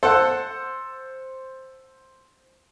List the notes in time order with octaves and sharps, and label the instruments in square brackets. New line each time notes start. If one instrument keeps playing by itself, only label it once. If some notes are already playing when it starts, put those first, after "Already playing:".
[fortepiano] A4 F#5 [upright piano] C5